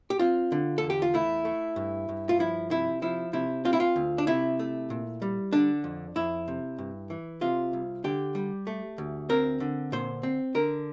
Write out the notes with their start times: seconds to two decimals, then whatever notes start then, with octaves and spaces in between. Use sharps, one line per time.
0.10 G4
0.19 C4 F4
0.52 D3
0.78 A4
0.83 E2
0.90 G4
1.02 F4
1.14 A3 E4
1.45 A3
1.76 G2
2.09 G2
2.29 F4
2.39 F3 E4
2.71 C3 E4
3.02 F3 E4
3.33 C3 E4
3.65 C4 F4
3.73 E4
3.80 F4
3.96 D2
4.18 D4
4.27 C3 E4
4.59 A3
4.90 A#2
5.22 G3
5.53 D3 D4
5.84 F2
6.16 F2 E4
6.48 C3
6.78 G2
7.10 E3
7.41 C3 F4
7.73 C2
8.04 D3 G4
8.35 G3
8.67 A3
8.98 D2
9.29 C4 A#4
9.60 D3
9.92 A#2 C5
10.23 C4
10.55 D3 A#4